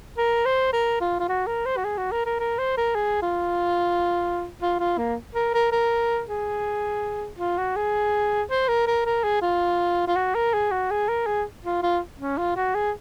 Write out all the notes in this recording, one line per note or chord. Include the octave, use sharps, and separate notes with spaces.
A#4
C5
A#4
F4
F4
F#4
A#4
C5
F#4
G#4
F#4
A#4
A#4
A#4
C5
A#4
G#4
F4
F4
F4
A#3
A#4
A#4
A#4
G#4
F4
F#4
G#4
C5
A#4
A#4
A#4
G#4
F4
F4
F#4
A#4
G#4
F#4
G#4
A#4
G#4
F4
F4
C#4
F4
F#4
G#4